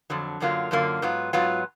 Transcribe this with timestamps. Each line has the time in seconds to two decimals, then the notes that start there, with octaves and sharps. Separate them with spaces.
0.10 F2 D3 F#3
0.40 F#2 D3 F#3 A#3 F4
0.71 F#2 D3 F#3 A#3 F4
1.02 G#2 F#3 B3 F4
1.33 G#2 F#3 B3 F4